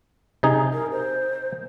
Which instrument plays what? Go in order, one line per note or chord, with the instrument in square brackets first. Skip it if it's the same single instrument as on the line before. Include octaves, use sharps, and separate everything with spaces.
[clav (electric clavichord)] C3 D#4 G#4
[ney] A#4
C5